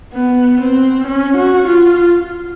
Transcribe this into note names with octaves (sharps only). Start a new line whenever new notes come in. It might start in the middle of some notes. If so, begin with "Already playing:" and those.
B3
C4
C#4
F#4
F4